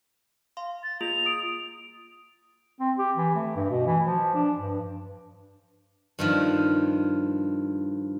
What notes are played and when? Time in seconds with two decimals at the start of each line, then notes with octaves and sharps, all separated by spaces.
0.57 F5 C6
0.83 A6
1.01 A#3 F4 G#4 F7
1.26 D#6 D7
2.80 C4
2.98 G4
3.16 E3
3.35 A3
3.56 G2
3.70 B2
3.86 E3
4.04 F3
4.34 D4
4.57 G2
6.19 G2 D#3 F3